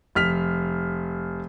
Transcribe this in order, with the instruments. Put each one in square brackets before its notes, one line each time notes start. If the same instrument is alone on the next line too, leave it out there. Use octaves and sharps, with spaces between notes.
[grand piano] F1 F6 B6 F7